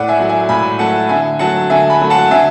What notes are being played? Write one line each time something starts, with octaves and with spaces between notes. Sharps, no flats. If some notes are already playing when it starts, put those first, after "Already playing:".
Already playing: A2 D5 F#5
E5 G#5
F#3 A3
E5 G#5
A2 G#5 B5
F#3 A3 F#5 A5
D3 E5 G#5
F#3 A3 F#5 A5
D3 E5 G#5
G#5 B5
F#3 A3
F#5 A5
D3 E5 G#5